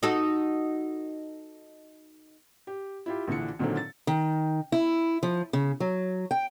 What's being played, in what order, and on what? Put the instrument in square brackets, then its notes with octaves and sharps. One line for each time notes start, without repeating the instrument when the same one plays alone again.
[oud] D#4 F#4 A4
[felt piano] G4
E4 F4 G4
A#1 D3 E3 D4 C#7
A#2 D3 D#3 F#3 C4 A4
A6
[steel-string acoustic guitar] D#3
E4
F3
C#3
F#3
G5